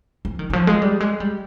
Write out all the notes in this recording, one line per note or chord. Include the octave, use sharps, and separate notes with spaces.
F3
D#3
D#3
F3
G#3
G3
G#3
G3